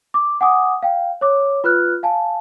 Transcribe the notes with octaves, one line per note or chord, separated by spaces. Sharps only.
D6
F#5 G#5 D6 D#6
F5 G5
C#5 D6
F4 B4 F6 F#6
F5 G#5 A5